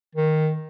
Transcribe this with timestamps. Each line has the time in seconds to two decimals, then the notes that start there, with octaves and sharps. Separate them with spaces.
0.15 D#3